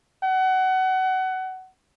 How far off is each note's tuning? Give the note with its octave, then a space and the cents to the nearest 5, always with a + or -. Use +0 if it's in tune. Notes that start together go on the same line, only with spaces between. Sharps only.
F#5 +25